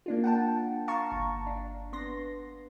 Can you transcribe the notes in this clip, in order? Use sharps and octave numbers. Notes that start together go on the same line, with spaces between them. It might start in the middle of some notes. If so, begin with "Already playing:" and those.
A#3 D4 F4
F#5 G5 A5
F5 A5 A#5 C#6
G1
D4
B3 C6 A#6